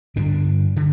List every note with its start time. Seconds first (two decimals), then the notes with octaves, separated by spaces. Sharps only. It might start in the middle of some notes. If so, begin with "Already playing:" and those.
0.16 G2 D3 D4
0.76 D3